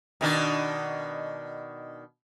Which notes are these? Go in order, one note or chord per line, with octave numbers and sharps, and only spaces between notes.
B2 D#3 D4